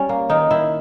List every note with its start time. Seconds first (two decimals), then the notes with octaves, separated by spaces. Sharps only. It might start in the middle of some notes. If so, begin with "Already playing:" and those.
Already playing: G3 C#4
0.09 A#3
0.30 D#3 D#4
0.51 D#3 E4